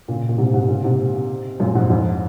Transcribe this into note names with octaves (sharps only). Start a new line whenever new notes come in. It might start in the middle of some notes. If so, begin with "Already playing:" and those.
A#2 C#3
A#2
G#2 C3
G#2 C3
A#2 C#3
G#2 C3
F#2 A#2
F2 G#2
F2 G#2